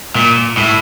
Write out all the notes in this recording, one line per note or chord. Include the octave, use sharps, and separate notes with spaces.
A#2
A2